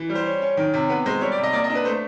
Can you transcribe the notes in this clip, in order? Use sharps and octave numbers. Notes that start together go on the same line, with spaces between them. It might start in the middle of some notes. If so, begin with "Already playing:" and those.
Already playing: E3
G3
C5
C#4
C#4
D#3
C3
B3 B4
G#3 C5
G3 C#5
D5
C3
D#5
A#3 D5
D#5
D4
B4
A3 C5